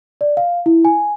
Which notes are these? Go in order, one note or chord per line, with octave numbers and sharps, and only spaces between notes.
D5
F5
E4
G#5